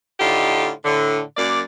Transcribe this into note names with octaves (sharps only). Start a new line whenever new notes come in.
A2 D3 D#4 F4 G4
A2 D3
F#2 A#3 D5